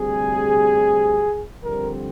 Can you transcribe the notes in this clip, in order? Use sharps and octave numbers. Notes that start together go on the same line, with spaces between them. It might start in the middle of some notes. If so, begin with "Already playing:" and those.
Already playing: D2 C3 G3 C4 G#4
F2 D3 G3 C4 A#4